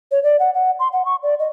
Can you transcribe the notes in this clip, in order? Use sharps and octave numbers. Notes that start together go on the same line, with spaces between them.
C#5
D5
F#5
F#5
C6
F#5
C#6
D5
D#5